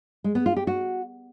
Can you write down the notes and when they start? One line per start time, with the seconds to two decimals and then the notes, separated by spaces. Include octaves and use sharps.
0.24 G#3
0.35 B3
0.46 F4
0.57 G4
0.67 F#4